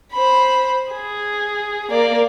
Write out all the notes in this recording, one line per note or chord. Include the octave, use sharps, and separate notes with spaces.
C5 B5
G#4
A#3 D5